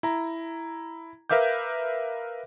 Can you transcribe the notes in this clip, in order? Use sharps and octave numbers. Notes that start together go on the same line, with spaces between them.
E4 A#5
A#4 B4 E5 F5 D6 G6